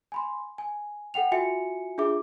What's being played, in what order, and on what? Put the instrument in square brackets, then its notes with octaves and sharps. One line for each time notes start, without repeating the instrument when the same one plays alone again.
[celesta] G#5 B5 C6
G#5
A4 F#5 G5 F7
F4 F#4 E5 G#5 C#7
D4 F4 G#4 E5 D6